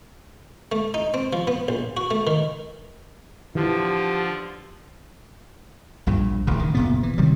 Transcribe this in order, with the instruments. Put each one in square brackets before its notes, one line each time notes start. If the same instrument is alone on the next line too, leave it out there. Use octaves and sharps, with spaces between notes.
[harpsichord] A3
D#4
C4
F3
B3
A#1
F#4
A3
D#3
[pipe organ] D3 F3 [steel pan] E3 [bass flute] G4
[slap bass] A#1 G2 A#2
D1 A1 C#3
D#3
F#1 A#2 B3
E3
C3 D#3 F#3 G3